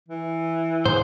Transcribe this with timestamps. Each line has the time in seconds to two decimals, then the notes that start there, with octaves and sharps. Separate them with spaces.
0.08 E3
0.85 G#2 C5